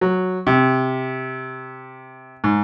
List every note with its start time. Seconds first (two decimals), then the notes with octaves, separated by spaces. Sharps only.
0.01 F#3
0.47 C3
2.44 G#2